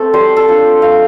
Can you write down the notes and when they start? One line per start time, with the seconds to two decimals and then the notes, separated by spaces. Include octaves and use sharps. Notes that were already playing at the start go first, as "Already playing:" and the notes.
Already playing: A3 C4 A4
0.14 G3 C5
0.37 A4
0.48 D4 F4
0.82 A3 F5